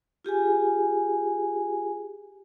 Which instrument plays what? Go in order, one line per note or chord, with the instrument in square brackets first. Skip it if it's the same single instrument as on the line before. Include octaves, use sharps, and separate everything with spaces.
[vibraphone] F4 G4 G#4 G#5